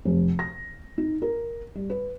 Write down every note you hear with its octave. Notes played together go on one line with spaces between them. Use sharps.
F1
A#6
D#4
A#4
G3
B4